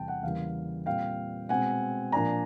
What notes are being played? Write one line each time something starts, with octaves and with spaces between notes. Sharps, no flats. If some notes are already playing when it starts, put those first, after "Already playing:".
Already playing: E2 C3 G3 G5 A5
F#5
E2 C#3 E3 G3 A#3 F5
A#2 G3 C4 F5 G5
B2 G#3 C4 F#5 G#5
A#2 F3 A#3 D4 G#5 A#5